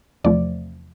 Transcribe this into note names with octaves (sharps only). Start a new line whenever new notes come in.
E2 C3 F3 A3 D5